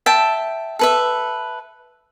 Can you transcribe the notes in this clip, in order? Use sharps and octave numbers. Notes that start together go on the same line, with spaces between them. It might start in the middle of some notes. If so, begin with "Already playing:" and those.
E5 G5 A5
A4 B4 E5